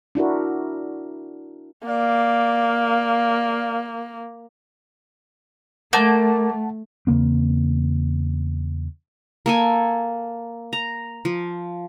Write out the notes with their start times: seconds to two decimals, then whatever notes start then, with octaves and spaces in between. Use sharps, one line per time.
0.15 D4 E4 F#4 A#4
1.88 A#3 D5 F5
5.93 A3 A#3 F#5 A5 G6
7.07 E2 C#3 A#3 C4
9.46 A#3 A4 G#5
10.73 A#5
11.25 F3